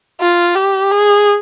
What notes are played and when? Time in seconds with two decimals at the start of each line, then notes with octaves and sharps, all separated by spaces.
0.21 F4
0.55 G4
0.91 G#4